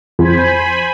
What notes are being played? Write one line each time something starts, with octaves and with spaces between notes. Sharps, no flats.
F2 C5 G#5 B5